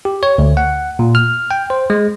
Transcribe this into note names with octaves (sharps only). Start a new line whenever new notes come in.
G4
C#5
D2
F#5
A#2
F6
G5
C5
G#3